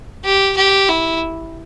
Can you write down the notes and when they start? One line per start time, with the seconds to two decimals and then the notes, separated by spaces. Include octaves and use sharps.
0.24 G4
0.57 G4
0.89 E4